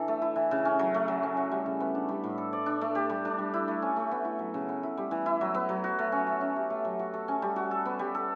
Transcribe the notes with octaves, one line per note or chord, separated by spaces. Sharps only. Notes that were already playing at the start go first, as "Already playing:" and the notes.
Already playing: E3 D4 A4
A3
E4
E3
C#3
C#4
F#3
A3
F#3
C#4
F#4
G3
C#3
B3
D4
G3
A2
A4
D5
D4
A3
G4
G3
D4
G3
E4
A3
C#4
A3
B3
E4
F#3
C#3
B3
E4
G3
E3
E4
F#3
B3
F#3
F#4
A3
C#4
A3
C#4
G4
A3
F#3
F#4
A4
C#4
G3
F#4
A4
B3
G3
A4